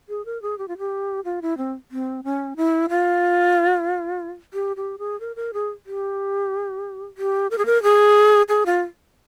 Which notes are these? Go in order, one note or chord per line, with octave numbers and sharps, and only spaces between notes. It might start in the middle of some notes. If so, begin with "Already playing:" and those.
G#4
A#4
G#4
G4
F4
G4
F4
E4
C4
C4
C#4
E4
F4
G4
G4
G#4
A#4
A#4
G#4
G4
G4
A#4
G#4
A#4
G#4
G#4
F4